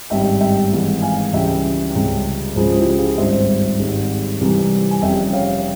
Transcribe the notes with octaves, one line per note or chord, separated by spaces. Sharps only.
G#1 G2 G3 E5 G5
E5 G5
G#1 G#2 E3
F5 G#5
C#2 C#3 E3 G3 E5 G5
C#2 C3 G3
C#2 C#3 F3 G#3 G#4 C5
E4 G4
F4 G#4
G#1 G2 G3 C5 E5
G#1 G#2 G3
C2 C3 E3 G3
G#5
F1 F2 C#3 G3 E5 G5
G5
C#5 F5